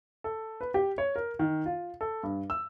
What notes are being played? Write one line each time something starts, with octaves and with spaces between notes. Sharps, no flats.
A4
B4
G4
C#5
A#4
D#3
F4
A4
G2
E6